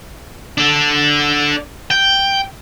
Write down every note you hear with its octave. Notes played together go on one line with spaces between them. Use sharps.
D4 A4
G5